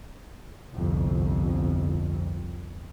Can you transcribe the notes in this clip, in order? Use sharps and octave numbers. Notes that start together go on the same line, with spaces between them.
G1 C2 F2